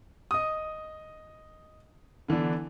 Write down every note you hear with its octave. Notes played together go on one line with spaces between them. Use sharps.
D#5 D#6
D3 E3 B3 D4